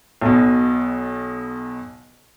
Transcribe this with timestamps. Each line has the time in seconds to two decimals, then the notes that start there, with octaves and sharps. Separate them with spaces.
0.21 B1 B2